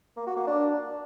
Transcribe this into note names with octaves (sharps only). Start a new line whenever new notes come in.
A#3
F#4
A#3
D4